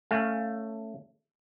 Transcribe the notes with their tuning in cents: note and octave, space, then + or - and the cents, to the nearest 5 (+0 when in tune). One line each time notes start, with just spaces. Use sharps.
A3 +15 C#4 +0 F5 +0